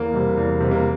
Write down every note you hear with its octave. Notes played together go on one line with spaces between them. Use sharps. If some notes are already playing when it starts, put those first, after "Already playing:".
Already playing: E2 A#3
C3 G3
E2
C3 G3
A#3